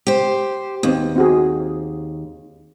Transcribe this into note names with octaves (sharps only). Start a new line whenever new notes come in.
G4 C5
D#2 B3 C4
C4 F#4 G#4